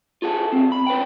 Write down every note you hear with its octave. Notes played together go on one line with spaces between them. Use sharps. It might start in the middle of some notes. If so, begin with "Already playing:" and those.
F4 G#4 A4 F#5
E3 C4
B5
C#4 B4 F#5 G5